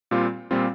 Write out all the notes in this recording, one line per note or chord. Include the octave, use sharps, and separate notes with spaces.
A#2 G3 C4 F4
A#2 G3 C4 F4